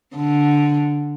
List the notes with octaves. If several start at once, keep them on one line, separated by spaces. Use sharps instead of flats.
D3